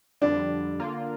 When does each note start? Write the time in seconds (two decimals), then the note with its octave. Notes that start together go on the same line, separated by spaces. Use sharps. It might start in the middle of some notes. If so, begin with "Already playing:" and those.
0.21 F2 D3 G3 D4
0.80 D3 A#3 F4